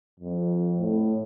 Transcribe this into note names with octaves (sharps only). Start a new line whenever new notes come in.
F2
A2